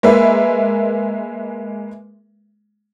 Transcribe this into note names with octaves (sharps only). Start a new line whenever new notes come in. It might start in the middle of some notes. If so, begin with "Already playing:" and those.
G#3 A#3 B4 E5